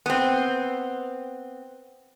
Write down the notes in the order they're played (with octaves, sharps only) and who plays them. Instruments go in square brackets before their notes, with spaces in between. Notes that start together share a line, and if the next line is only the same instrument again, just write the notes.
[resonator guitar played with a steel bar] B3 C4